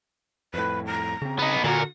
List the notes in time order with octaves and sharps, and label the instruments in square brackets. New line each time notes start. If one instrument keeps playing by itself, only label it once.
[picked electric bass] F2 A2 [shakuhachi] B4
[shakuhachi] A#5
[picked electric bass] C#3 C4
[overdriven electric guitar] B3 D#4
[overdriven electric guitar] A#2 A#4 [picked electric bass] D3 [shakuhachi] F#4